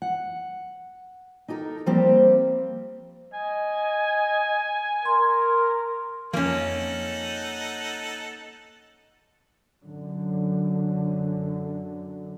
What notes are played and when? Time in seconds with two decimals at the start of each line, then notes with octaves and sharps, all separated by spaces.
0.02 F#5
1.48 D#4 G4 A4 A#4
1.86 F3 G3 A#3 C4 G4
3.34 D#5 G#5
5.05 A#4 C6
6.33 F2 F3 A#3 C#4 D#4 A4 F#5
9.85 F#2 D3 F#3